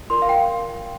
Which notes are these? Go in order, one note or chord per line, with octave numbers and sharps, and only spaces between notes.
F4 A#4 D5 C6
F5
G5